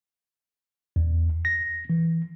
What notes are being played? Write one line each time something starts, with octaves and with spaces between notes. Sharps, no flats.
E2
A#6
E3